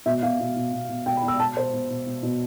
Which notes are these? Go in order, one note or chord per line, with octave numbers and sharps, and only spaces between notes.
B2 E5
B2 F5
B2
B2
B2
B2
B2 G5
B5
B2
E6
B2 A5
B2 C5
B2
B2
B2
B2